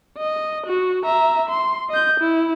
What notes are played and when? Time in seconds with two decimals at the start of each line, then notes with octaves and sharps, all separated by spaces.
0.18 D#5
0.67 F#4
1.04 E5 A#5
1.50 C6
1.90 D#5 G6
2.20 E4